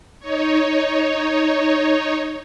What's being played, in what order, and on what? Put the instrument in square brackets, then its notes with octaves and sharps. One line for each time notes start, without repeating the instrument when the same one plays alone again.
[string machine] D#4 C#5